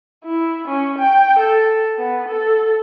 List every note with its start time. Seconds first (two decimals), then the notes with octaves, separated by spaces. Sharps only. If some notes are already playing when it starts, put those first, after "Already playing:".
0.24 E4
0.67 C#4
0.98 G5
1.39 A4
1.98 B3
2.28 A4